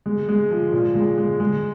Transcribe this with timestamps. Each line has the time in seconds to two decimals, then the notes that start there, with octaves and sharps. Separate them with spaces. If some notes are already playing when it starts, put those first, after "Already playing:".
0.06 G#3
0.29 G#3
0.51 F3
0.73 A#2
0.95 G#3
1.18 G#3
1.40 G#3